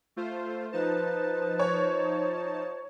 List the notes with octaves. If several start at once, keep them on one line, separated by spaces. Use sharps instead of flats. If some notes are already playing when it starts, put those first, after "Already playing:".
A3 F4 C5
F3 D#4 B4 C5 A5
C#5